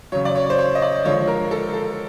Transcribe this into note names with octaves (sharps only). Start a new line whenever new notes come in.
C#3 F#3 C#5
D5
C#5
C5
C#5
D#5
D5
D3 F3 G#3 C#5
A#4
A4
A4